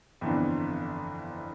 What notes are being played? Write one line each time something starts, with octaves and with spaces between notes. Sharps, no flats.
G1 F2 E3 B3 D4